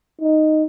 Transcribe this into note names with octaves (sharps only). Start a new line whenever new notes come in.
D#4